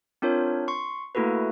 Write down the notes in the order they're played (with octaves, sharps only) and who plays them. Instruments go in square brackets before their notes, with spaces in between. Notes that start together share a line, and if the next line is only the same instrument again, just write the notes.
[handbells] C4 D4 F4 A#4 C#5
C6 C#6
A3 A#3 E4 F#4 A4 B4